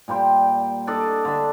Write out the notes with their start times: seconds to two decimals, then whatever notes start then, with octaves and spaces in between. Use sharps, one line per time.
0.08 A#2 G3 G5 C6
0.87 D4 A4 D5 D#5
1.25 D3 E5